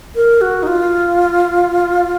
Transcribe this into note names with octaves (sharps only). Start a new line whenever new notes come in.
A#4
F#4
D#4
F4